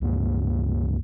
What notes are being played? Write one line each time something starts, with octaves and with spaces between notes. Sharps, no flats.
C#2 G2 A#3